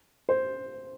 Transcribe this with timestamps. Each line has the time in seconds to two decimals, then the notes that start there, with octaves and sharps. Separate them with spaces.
0.29 C5